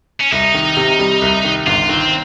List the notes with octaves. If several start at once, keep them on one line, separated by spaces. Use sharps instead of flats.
C#4
C2 D#4
D#3
C3
G3
C2
D#3
G1 F4
D#3 C4